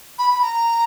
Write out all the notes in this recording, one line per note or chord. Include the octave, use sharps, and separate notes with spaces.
B5
B5
A#5